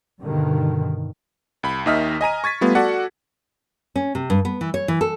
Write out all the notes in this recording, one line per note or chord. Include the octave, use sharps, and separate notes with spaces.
G2 B2 D3 D#3
C2 B5
D#2 D#3 D#5 E5 F6 B6
D#5 G#5 A#5 D#7
C#6 G#6 A6 B6
G3 A3 B3 F4
F#4 A4 D5 F#5
C#4
C3
G2
B3
E3
C#5
E3
A4